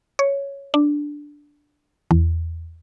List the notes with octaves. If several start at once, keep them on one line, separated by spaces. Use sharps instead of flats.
C#5
D4
E2